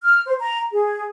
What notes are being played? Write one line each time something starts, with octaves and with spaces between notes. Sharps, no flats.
F6
C5
A#5
G#4